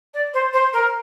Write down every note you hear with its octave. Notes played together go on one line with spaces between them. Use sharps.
D5
C5
C5
A#4